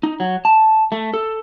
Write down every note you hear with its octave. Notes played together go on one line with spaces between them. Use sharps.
D#4
F#3
A5
A3
A4